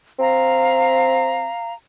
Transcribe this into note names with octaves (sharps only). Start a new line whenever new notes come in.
C4 F5 A#5